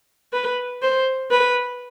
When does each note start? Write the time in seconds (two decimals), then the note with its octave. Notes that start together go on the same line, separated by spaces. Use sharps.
0.33 B4
0.82 C5
1.31 B4